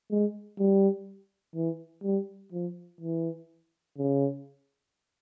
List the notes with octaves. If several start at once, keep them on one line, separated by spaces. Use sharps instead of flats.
G#3
G3
E3
G3
F3
E3
C#3